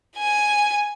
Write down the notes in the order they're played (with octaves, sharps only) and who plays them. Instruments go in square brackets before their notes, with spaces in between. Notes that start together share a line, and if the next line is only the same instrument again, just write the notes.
[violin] G#5 G#6